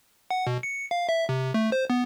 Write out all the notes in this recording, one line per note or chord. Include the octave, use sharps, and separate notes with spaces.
F#5
B2
C#7
F5
E5
C3
A3
C5
B3